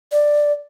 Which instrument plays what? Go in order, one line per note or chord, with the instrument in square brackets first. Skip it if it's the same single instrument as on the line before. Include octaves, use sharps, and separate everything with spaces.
[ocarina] D5